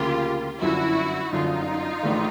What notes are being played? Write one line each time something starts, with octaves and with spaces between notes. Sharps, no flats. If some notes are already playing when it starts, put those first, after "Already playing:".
Already playing: D2 C#3 F3 A#3 F4 G4
G1 F#2 D3 F3 E4 F#4
G1 F#2 D3 F3 D#4 F4
A#1 A2 E3 A3 D4